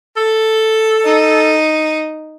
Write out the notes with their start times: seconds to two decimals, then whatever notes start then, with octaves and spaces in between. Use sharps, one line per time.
0.17 A4
1.05 D#4